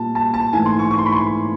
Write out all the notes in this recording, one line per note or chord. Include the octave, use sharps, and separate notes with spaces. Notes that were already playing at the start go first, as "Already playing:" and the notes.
Already playing: A#2 G3 A#3 A5
A5
A5
G#2 E3 A3 G#5
C6
C#6
C#6
C6
B5
C6